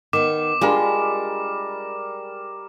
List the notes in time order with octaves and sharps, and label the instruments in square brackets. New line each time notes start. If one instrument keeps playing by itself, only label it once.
[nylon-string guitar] D#3 B3 [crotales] D6
[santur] G3 A#4 [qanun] G#3 [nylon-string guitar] D4 F4